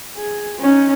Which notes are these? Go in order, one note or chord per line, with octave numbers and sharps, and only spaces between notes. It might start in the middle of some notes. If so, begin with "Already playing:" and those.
G#4
C#4 D#4